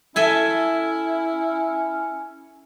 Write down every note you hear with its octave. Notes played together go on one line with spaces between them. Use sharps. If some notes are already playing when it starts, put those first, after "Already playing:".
C#4 E4 A4 E5 G#5